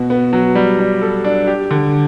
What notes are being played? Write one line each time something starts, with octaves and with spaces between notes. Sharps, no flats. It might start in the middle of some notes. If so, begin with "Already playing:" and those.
Already playing: B2 F#4
B3
F#3
G3
G3
A4
D4
G4
D3